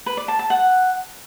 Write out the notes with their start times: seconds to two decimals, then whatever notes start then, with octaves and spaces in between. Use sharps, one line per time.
0.06 B4
0.17 D5
0.28 A5
0.39 A5
0.50 F#5